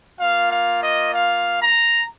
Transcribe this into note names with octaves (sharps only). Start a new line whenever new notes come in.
A#3 F4 F5
F5
D#5
F5
A#5